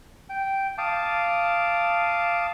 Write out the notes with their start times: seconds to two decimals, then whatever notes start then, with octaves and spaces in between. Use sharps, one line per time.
0.29 G5
0.78 F5 A5 D6 D#6